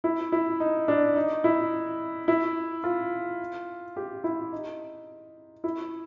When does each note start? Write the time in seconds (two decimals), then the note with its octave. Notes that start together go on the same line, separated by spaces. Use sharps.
0.04 E4
0.32 E4
0.60 D#4
0.88 D4
1.16 D#4
1.44 E4
2.28 E4
2.84 F4
3.96 G4
4.24 E4
4.52 D#4
5.64 E4